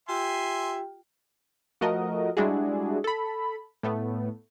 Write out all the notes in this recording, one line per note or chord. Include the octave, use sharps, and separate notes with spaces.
F4 G4 E5 G5 G#5 C6
F3 A3 F#4 A#4 D#5
G3 G#3 D4 E4 F#4 G#4
A4 B5
A2 A3 B3